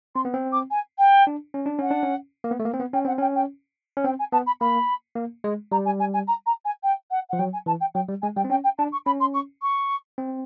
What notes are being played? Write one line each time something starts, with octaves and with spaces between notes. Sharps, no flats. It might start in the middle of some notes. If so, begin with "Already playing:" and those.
C4 C6
B3
C4
D6
G#5
G5
D4
C#4
D4
C#4 F#5
D4
C#4
A#3
B3
A3
A#3
C4
B3
C#4 G5
C4 F#5
C#4 G5
G5
C#4
C4 G5
G#5
B3 A5
B5
A#3 B5
A#3
G#3
G3 A#5
G#5
G#5
G#5
A#5
A#5
G#5
G5
F#5
F3 F#5
F#3 G5
G#5
E3 A5
G5
F#3 G5
G3
G#3 G#5
G3 G5
C4
C#4 G5
G5
D4 A5
C#6
C#4 B5
C6
C#6
C#6
C4